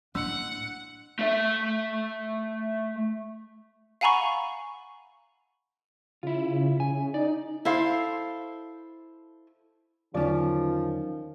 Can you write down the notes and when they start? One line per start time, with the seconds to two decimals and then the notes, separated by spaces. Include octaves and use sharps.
0.15 A2 A#3 D4 F#5
1.19 A3 E5
4.01 F5 F#5 G#5 A#5 B5 C#6
6.23 C#3 E4 F4
6.80 C#3 G#5
7.14 D#4 D5
7.65 E4 A4 C5 F5
10.14 E2 D3 D#3 F3 F#3 C#4 D5